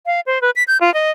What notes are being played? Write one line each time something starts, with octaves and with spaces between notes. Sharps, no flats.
F5
C5
B4
B6
G6
F4
D#5